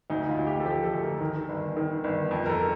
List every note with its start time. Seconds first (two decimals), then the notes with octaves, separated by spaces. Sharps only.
0.10 D2 D#4
0.29 F4
0.38 D2
0.47 G4
0.60 A4
0.65 F3 G4
0.83 A4
0.94 D2
1.03 A#4
1.20 D#3
1.49 G1
1.77 D#3
2.04 G1
2.31 F2
2.46 A#4
2.50 A4